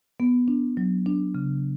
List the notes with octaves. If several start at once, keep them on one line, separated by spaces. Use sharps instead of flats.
B3
D4
F#3
D4
C#3